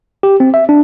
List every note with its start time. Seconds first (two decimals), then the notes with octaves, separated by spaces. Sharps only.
0.23 G4
0.40 C4
0.54 E5
0.69 D4